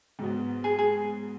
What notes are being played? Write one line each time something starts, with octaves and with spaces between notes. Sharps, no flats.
G#2 F#3 B3
G#4
G#4